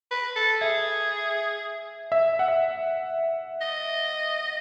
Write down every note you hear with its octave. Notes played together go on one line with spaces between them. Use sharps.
B4
A4
G#4 E5
E5
F#5
E5
D#5